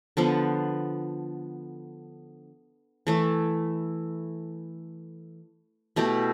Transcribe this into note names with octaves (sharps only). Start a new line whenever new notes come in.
D3 F3 B3
E3 A3 E4
B2 A3 E4 G4